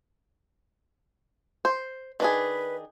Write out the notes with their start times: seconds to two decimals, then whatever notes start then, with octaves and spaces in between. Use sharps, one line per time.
1.65 C5
2.20 D#3 D4 G#4 B4